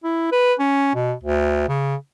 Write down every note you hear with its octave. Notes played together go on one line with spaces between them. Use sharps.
E4
B4
C#4
B2
D2
C#3